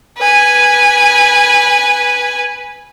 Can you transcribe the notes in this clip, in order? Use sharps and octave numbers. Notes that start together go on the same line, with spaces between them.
B4 G#5